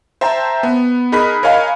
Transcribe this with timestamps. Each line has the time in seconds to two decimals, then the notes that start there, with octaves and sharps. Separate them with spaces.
0.21 C5 E5 G5 A5 A#5
0.63 B3
1.12 D#4 G#4 A#4 B5 F#6 B6
1.43 A#4 C#5 D#5 F5 G#5 B5